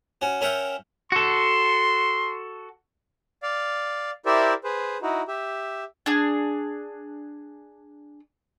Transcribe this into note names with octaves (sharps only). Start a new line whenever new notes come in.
C#4 F#4
C#4 A#4 E5 F#5 G5
F#4 A4 C6
D5 F5
E4 G4 A#4 C5 D5 E5
G#4 B4 C5
D#4 E4 F#4
G4 E5
D4 G#4